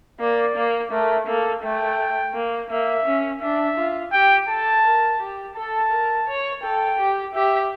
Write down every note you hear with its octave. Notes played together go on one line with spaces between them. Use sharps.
A#3 D5
A#3
A3 A#4
A#3 A4
A3 G5
A#3
A#3 E5
C#4
D4 E5
F4
G4 G5
A4 A5
A#4
G4
A4 A5
A#4
C#5
A4 G5
G4
G4 E5